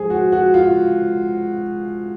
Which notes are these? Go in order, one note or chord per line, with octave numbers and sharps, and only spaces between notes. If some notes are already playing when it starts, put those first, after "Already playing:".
Already playing: G#2 F3 G#4 C5
F#4
F#4
F4